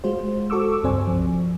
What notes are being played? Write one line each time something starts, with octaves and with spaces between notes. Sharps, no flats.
G#3 F4 F#4 C5
F#4 A4 C#6 D6 E6
C#2 G2 C4 C5 D5 G#5
F3